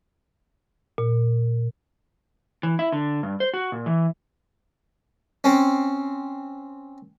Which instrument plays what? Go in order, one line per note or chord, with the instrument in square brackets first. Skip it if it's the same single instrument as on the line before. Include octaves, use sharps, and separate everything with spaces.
[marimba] A#2
[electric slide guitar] E3
E4
D3
G2
C5
F#4
A#2
E3
[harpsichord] C4 C#4